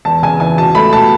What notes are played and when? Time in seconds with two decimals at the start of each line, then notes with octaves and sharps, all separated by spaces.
0.05 E2 A5
0.22 C#3 G#5
0.40 E3 G#5
0.57 B2 A5
0.75 A3 B5
0.93 B2 A5